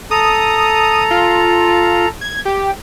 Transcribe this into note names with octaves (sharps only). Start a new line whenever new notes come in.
A4 A#5 D#6
F4
G#6
G4